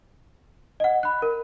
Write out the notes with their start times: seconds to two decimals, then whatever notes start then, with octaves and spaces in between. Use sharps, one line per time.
0.80 D#5 F#5
1.03 B5 F#6
1.22 A#4